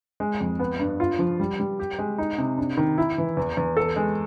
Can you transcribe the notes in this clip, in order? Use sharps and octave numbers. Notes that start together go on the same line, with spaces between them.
G#3
F2
B3
G2
F4
F3
G3
G3
G4
G#3
D#4
C3
D4
D#3
E4
E3
E2
E2
A4
G#3